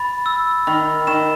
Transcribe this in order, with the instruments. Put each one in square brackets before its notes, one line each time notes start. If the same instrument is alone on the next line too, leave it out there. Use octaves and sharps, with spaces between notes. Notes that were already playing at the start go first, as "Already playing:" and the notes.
Already playing: [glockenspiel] B5 A6
E6
[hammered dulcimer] D#3 [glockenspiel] B5
[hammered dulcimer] D#3 [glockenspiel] E7